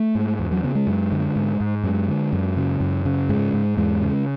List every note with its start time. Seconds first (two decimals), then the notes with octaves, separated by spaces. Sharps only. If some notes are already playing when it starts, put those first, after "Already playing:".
Already playing: A3
0.15 G#2
0.39 E2
0.52 F#3
0.63 C#3 B3
0.75 G#3
0.87 F#2
1.12 D3
1.36 G#2
1.60 G#2
1.83 F#2 G#3
2.08 D3
2.33 F#2
2.57 C#3
2.80 F#2
3.05 C#3
3.29 G#2 G#3
3.53 G#2
3.77 E2 G#3
4.02 C#3